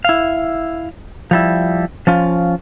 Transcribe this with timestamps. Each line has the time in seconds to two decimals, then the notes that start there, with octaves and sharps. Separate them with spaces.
0.05 E4 F5
1.31 F3 G3 E4
2.07 F3 C#4 F4